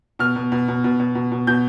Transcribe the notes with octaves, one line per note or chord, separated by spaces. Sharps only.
B2 F6
B2
B2
B2
B2
B2
B2
B2
B2 G6